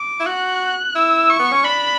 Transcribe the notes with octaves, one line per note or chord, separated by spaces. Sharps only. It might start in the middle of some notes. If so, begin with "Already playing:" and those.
Already playing: D6
E4
F#4 F#6
E4 E6
C#6
B3
C#4
D4 B5